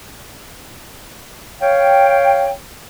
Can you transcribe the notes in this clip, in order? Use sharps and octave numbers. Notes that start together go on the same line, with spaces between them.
C#5 F5 G5